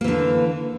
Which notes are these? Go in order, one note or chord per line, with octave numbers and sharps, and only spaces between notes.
D3 E3 A#3